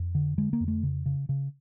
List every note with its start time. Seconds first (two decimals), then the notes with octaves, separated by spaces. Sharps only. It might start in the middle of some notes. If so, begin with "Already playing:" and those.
Already playing: F2
0.15 D3
0.38 D3 G#3
0.53 A#3
0.60 F2
0.68 A3
0.83 C#3
1.06 C#3
1.29 C#3